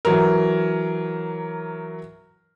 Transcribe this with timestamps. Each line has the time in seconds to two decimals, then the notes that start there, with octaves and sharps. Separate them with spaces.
0.05 E3 F#3 A#4